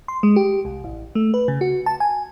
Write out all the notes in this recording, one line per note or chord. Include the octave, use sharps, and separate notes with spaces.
C6
G#3
G4
C2
A1
A3
B4
C#3
F#4
A5
G#5